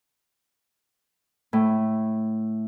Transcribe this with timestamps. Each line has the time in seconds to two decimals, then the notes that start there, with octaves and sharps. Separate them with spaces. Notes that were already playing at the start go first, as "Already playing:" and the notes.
1.53 A2